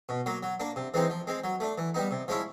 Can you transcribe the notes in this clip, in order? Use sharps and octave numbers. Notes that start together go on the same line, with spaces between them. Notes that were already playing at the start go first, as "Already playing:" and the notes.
B2
F#3 A#3
F#3
A#3 D4
C3
E3 G#3 C4 D#4
F3
G#3 C4
F#3
A3 D4
E3
G3 B3 D#4
C3
F3 G#3 C#4 E4